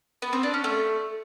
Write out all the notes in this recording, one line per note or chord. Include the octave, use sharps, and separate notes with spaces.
B3
C4
D4
C#4
A3